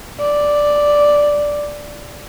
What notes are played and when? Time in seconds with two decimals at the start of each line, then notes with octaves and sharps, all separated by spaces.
0.20 D5